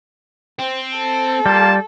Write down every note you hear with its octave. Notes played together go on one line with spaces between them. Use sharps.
C4
A4
G3 A#3 F4 A5